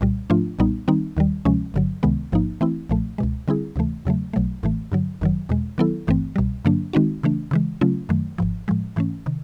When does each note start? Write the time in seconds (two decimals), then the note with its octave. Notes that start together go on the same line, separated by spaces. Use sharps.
0.01 C2 A#2 G3
0.30 G#2 F3 A3 D4 F4
0.59 B1 A#2 G3 B3 D#4
0.88 D#3 G3 C4 D#4
1.17 D#2 D#3 G3
1.45 D2 C3 F3 G#3 C#4
1.74 G1 G2 D3 F#3
2.03 C#2 C3 D#3 G#3 B3
2.32 A1 G#2 F3 A#3 D#4
2.61 E3 A3 C4 E4
2.89 B1 A#2 F3 A3
3.18 C#2 B2 G#3
3.48 D3 G3 C4 E4 G#4
3.76 D2 C3 E3 A3
4.05 E2 C#3 F#3 A3
4.33 B1 B2 F#3 A3
4.63 A1 A2 E3 A3
4.92 G2 D3 F#3
5.21 G1 F#2 D#3 F#3
5.49 E2 B2 G#3
5.78 D#3 F#3 B3 E4 A4
6.07 G1 G2 E3 A3 C4
6.36 C2 B2 G3
6.65 G2 D3 F#3 A#3 D4
6.93 D#3 G#3 C4 D#4 F#4
7.23 C#3 E3 A3 D4
7.51 C#3 E3 G#3
7.81 C#3 F#3 A3 C#4 F4
8.09 F#2 D#3 F#3 A3
8.38 G#1 G#2 F3
8.68 A2 F3 G#3
8.96 G#2 E3 A3 C#4
9.26 C3 D#3